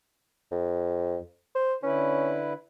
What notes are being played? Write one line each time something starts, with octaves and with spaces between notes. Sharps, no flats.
F2
C5
D3 C#4 E4 B4